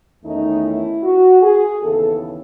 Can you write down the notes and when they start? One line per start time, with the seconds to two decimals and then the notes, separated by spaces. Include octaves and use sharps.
0.24 E2 D#3 A3 C#4 D#4
0.64 E4
1.03 F#4
1.42 G#4
1.81 D#2 C#3 E3 B3 A4